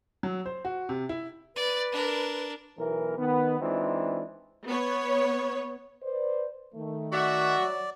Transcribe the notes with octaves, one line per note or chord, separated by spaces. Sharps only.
F#3
C5
F#4
C3
E4
B4 D5
D4 A#4
B1 E3 A#4
D#3 B3
E3 G#3 C4 D4 D#4 F4
B3 C#5
B4 C5 D5
D#3 A3
F#4 D5 E5
F#3